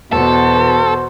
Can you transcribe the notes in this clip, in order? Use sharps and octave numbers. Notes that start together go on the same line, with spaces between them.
E2 B2 B3 F#4 A4 C5